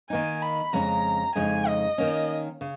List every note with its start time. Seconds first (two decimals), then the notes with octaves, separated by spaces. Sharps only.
0.10 D#3 A#3 D#4 G#5
0.42 B5
0.73 F2 C#3 G#3 C#4 A#5
1.35 F2 C#3 G#3 D#4 G#5
1.67 D#5
1.98 D#3 A#3 C#4
2.61 C#3